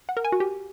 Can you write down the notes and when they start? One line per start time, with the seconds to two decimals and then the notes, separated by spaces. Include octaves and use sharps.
0.09 F#5
0.17 A#4
0.25 G#5
0.32 F#4
0.40 G4